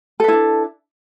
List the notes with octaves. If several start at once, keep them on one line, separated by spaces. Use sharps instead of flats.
D4 E4 A4 B4